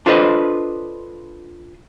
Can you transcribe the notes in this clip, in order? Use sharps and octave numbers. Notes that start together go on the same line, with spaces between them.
D4 F4 A4 B4 C5 D#5